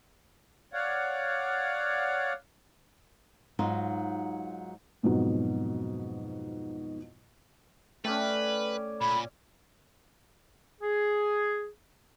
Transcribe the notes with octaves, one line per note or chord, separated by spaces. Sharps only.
C#5 D5 F5 F#5
G#2 F#3 D#4 F4 F#4
F2 G#2 B2 F#3
A3 C#4 B4 D5 G5
A#2 B5
G#4